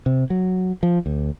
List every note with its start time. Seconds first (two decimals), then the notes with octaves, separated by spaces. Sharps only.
0.06 C3
0.30 F#3
0.83 F3
1.06 D2